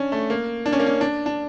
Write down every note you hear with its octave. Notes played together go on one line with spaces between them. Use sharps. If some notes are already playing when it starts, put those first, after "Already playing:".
Already playing: C#4 D4
A3
A#3
D4
C#4
A#3
C#4
D4
D4